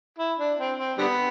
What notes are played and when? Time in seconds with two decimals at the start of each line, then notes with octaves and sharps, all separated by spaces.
0.19 E4
0.39 D4
0.59 C4
0.78 C4
0.98 D3 G3 B3